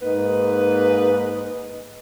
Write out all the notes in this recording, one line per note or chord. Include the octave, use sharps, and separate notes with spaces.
G#2 A#3 D#4 B4